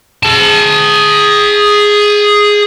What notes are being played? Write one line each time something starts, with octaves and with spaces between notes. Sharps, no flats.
G#4 A5